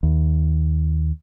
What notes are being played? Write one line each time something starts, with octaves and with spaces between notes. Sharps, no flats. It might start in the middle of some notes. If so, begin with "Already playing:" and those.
D#2